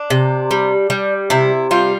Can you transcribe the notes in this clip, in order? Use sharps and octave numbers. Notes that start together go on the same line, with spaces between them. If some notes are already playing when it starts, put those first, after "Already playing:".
Already playing: D4
C3
G3
G3
C3 E4
G3 F4